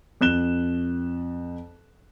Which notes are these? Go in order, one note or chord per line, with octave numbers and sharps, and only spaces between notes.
F2 F#6 E7 G7